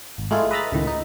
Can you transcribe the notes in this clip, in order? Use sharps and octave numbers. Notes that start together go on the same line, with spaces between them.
G#1
G#3 A3 E4 F4 G#4
B4 D#5 E5 A#5 B5 A6
C#2 A2 D#3
D#4